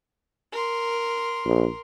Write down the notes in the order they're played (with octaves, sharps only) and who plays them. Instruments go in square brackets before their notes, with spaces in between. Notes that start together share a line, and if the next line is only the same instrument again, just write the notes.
[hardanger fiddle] A#4 C6
[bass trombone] A#1